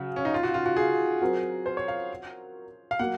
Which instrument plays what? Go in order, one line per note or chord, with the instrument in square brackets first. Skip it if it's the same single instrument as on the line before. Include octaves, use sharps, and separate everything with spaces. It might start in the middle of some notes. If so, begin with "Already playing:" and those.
Already playing: [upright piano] C#3 F#3 [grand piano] F#4
[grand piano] C#4
D#4
F4
F#4
F4
F#4
G#4
[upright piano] F#3 C4 F#4 A#4
[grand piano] C5
C#5
F5
F5
[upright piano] F#3 A#3 [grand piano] F#5